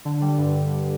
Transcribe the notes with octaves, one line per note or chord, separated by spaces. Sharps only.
D3
G3
G2